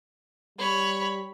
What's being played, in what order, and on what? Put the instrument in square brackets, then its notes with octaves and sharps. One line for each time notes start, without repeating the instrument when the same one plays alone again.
[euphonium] G3 [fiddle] C#5 B5